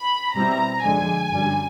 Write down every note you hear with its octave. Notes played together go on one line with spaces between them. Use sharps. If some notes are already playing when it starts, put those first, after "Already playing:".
Already playing: B5
B2 G3 C4 E4 A#5
F2 D3 F3 G#3 G#5
F#2 D3 G3